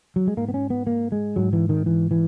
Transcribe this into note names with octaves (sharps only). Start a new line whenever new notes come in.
F#3
G#3
G#2 A#3
B3
C#4
B3
A#3
G#3
G#2 F#3
E3
D#3
E3
E3